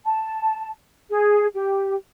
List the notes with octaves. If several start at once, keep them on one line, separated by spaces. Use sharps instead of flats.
A5
G#4
G4